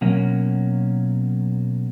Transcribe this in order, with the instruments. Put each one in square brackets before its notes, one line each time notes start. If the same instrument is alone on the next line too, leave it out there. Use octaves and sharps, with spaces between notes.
[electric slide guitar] B2 F#3 A#3 C#4